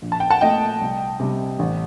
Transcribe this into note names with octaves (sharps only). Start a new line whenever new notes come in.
A#1
A5
G5
F#5 A5
A#2 A3 D#5 G5
C2
C3 G3
A1